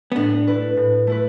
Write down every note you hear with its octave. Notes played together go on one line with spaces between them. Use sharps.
B3
A2 D4
A3 E4 B4
A2
A3 E4 B4